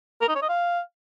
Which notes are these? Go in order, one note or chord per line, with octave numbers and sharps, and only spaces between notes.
A#4
D#4
C#5
D#5
F5